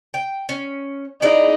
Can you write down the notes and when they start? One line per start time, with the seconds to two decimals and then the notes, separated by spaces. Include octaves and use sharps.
0.14 G5
0.49 C#4
1.22 D#4 E4 G#4 D5